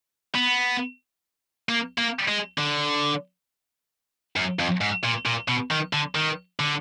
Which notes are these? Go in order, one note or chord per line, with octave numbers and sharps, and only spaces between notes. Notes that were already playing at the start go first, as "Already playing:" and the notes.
B3
A#3
A#3
G#3
D3
F#2
F2
G#2
A#2
A#2
B2
D#3
D3
D#3
D3